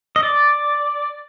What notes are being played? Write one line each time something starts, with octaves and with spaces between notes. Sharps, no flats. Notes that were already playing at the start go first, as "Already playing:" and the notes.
D#5
D5